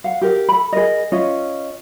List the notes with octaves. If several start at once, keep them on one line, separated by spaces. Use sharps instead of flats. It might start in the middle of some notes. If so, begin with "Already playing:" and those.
F5 F#5
G4 A#4
A4 B5
G#4 A#4 D#5
C#4 F4 D#5